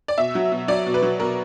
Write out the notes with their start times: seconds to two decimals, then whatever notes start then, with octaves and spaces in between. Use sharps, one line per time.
0.08 D5
0.18 B2 E5
0.35 F#3
0.52 B2
0.68 F#3 D5
0.86 B2
0.94 B4
1.02 F#3
1.20 B2 A#4